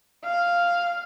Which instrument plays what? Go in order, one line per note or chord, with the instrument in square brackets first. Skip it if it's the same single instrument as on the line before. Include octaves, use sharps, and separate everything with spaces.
[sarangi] F5